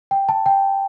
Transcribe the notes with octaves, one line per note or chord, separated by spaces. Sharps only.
G5
A5
G5